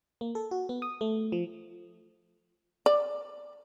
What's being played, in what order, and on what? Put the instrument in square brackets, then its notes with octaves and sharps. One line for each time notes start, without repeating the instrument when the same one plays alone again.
[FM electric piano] A#3
A4
F#4
B3
D#6
A3
F3
[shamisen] D5